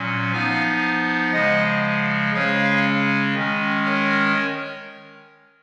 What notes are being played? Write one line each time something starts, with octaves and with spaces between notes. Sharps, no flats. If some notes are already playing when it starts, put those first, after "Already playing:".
Already playing: A#2 F#3 C#4
F3 B3 D#4 F5 G#5
C#3 F3 G#3 D#5 F#5
C#3 G#3 C#4 C#5 F5
D#3 G#3 C#4
A#4 C#5